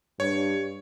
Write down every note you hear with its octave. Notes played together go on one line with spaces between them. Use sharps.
G2 C#5